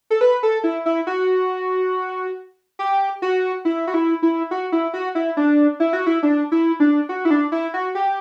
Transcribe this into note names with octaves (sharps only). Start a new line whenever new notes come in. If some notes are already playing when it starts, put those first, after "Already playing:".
A4
B4
A4
E4
E4
F#4
G4
F#4
E4
F#4
E4
E4
F#4
E4
F#4
E4
D4
E4
F#4
E4
D4
E4
D4
F#4
E4
D4
E4
F#4
G4